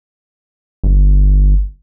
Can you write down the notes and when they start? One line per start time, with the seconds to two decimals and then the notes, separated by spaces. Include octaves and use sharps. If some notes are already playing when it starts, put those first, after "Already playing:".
0.84 G1